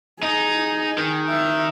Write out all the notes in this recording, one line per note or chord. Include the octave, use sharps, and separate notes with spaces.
D#4 G#4
D#3
E5